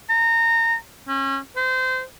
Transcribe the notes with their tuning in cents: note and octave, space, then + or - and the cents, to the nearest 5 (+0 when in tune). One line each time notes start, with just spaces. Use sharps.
A#5 -25
C#4 -30
C5 -25